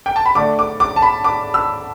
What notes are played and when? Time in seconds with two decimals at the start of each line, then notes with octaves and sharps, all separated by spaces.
0.06 G5
0.16 A5
0.26 B5
0.35 D3 A3 D4 D6
0.59 D6
0.80 D6
0.96 A5
1.02 B5
1.24 D6
1.54 E6